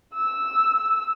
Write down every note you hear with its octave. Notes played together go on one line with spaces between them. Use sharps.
E6